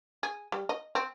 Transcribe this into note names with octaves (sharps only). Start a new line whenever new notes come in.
G#4
G3
D#5
C4